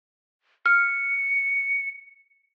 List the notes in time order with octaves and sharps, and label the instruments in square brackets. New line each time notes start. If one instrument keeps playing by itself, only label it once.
[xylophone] F6 [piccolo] C#7